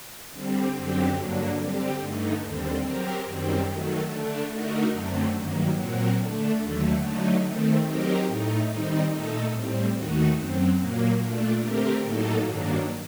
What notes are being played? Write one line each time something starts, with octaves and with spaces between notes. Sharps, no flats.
D3 G3 C4
F#2 D3 F#3 C4 G4
G2 D3 F#3 A#3 D4
D3 G3 C4 G4
G2 D3 A3 D#4
D#2 D3 G3 C4
F#3 C4 G4 A#4
F#2 D#3 G3 C4
D#3 F#3 A3
D3 A3 D4
D3 A3 D#4 F#4 A#4
F#2 D3 F#3 A3 C4
G2 D#3 F#3 A#3
A#2 F#3 C4 F#4 A#4
D3 A3 D4
D#2 D3 F#3 A3
D3 F#3 A3 D#4
D#3 A3 C4
F#3 C4 D#4 G4 A#4
A2 A3 D#4
D#3 G3 C4 D#4
A#2 A3 D#4 A4
A2 G3 C4
D#2 D#3 A3 D#4 F#4
F#2 F#3 C4
A#2 F#3 A#3
A#2 A3 D4
D3 A3 C4 G4 A#4
A2 F#3 A#3 D#4 A4
G2 D#3 F#3 A#3 D4